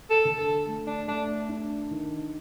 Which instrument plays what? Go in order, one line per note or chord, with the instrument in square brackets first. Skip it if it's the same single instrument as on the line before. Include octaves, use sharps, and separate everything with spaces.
[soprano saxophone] A4
[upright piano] D3
[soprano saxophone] A4
[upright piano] A3
[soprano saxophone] D4
[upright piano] A3 [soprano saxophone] D4
[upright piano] D4
D#3